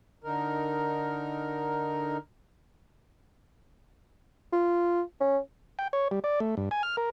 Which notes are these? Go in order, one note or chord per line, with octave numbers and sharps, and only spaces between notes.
D3 D#4 A#4
F4
C#4
G5
C#5
G3
D5
A3
G2
G#5
F6
A#4